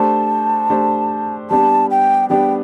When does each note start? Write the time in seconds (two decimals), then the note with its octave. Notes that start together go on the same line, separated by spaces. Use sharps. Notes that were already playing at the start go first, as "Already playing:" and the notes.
Already playing: A3 D4 G4 C5 A5
0.70 A3 D4 G4 C5
1.50 G3 B3 D4 G4 A5
1.90 G5
2.29 G3 B3 D4 G4 G5